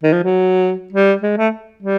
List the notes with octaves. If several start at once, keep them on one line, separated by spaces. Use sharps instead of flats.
D#3
F3
F#3
G3
G#3
A3
G3